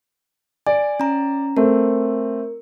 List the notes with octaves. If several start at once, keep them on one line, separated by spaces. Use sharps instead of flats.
D5 G#5
C#4 A#5
A3 C4 A#4